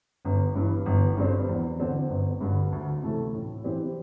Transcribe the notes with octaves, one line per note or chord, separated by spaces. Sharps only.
G1
G2 E3
G1
G2 G3 C4
E2
D3 C4
G1
G2 D3
D2
C3 E3 A3
A2
E3 C4 G4